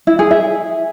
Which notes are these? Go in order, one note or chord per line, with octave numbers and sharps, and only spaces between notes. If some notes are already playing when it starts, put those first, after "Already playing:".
E4
G#4
E5